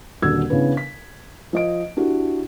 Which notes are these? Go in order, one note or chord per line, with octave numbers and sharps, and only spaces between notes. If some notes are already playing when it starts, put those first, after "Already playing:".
D#1 D3 F#4 E6 G#6
C#3 E3 B3 D4 B4
B6
F3 D#5 D7
D4 E4 F#4 G4